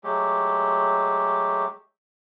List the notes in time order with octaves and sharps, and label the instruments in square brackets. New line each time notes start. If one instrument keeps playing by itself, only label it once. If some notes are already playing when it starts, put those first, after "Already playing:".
[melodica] F#3 G#3 A3 G4